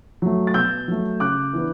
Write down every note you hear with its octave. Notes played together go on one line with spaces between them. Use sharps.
F#3 A3
A6
B2 E6 G6
F#3 A3
C#3 D6 F#6
E3 B3 D4